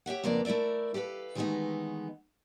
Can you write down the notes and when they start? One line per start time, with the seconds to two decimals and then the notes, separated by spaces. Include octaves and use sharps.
0.06 G4 C#5 E5 F#5
0.24 F2 C#3 A#3 B3 D4 D5
0.45 A3 E4 A#4 D5 E5
0.94 G4 A4 B4 F5
1.35 D#3 E3 G#3 A3 B3 D#4